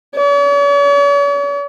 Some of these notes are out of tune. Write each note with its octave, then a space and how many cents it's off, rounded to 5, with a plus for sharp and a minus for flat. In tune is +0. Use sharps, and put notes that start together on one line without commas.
C#5 +45